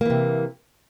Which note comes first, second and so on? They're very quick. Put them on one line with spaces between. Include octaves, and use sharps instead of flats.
A#3 E3 C3